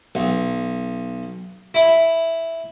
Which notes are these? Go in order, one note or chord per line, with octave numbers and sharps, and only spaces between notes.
B1
E4